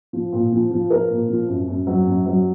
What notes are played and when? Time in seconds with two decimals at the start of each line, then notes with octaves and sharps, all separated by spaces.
0.13 F3
0.32 A#2
0.52 F3
0.71 F3
0.90 F3 A#4
1.10 A#2
1.29 F3
1.48 F#2
1.68 F#2
1.87 F#3
2.06 F#2
2.26 F#3